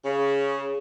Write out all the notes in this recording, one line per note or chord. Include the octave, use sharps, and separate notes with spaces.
C#3